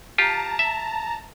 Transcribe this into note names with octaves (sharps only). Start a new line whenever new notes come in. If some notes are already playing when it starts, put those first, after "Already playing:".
F4 G4 A5 A#5
E5